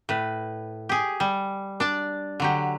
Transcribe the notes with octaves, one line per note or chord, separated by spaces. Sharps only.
A2 B4
G4 G#4
G3
D4 D5 A5
D3 F#3 G4